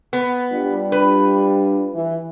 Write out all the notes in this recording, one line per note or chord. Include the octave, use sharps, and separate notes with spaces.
B3
G3 D4 F4
B4
E3